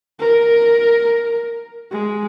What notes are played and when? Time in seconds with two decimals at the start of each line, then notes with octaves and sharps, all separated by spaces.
0.19 A#4
1.91 G#3